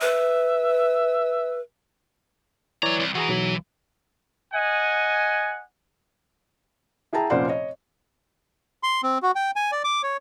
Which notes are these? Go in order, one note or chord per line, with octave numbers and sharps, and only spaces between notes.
B4 E5
E3 F#3 C#5 D5 A#5
C2
E3 F#4 G#4 A#5
B1 F#3
D#5 F#5 G#5
E4 G#4 G5 A5 A#5
F1 A#2 C#4 C5 D5 F#5
C#5 D#5
C6
C4
F#4
G5
G#5
D5
D6
C#5